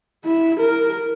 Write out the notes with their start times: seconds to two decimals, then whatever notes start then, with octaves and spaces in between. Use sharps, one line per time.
0.25 E4
0.60 A#4